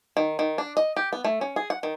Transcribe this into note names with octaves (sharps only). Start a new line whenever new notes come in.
D#3
D#3
D4
D#5
G4
B3
A3
C#4
G#4
F#5
D#3